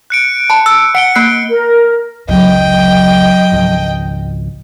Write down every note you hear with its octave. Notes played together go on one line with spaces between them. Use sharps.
F#6 C#7 D7
A5 B5
E6
F#5 C#7 D7 G7
A#3 F#6 C7
A#4
F1 C#2 F#2 F#3 D#5 G5
G#1 C#2 F3